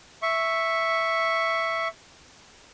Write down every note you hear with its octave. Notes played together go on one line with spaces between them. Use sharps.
E5 C#6